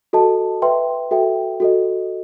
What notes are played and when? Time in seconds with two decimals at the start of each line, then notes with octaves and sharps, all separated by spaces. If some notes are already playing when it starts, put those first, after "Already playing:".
0.13 F#4 A4 D#5 A5
0.62 B4 E5 G5 C6
1.11 F#4 A4 E5 G5
1.60 F#4 A4 D#5